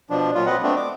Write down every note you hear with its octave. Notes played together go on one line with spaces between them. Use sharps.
B2 F3 D4
A#2 F#3 F4
C4 B4 D#5 F#5
A3 B3 C4 D4
D6